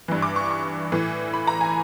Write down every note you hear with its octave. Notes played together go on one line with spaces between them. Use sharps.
G2 E3
D6
C#6
C#6
A2 E3
B5
A#5
G#5